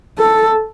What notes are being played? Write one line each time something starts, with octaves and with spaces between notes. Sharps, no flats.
A4